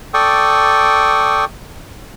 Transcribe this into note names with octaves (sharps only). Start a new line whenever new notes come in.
A4 D5 G5 C#6 D#6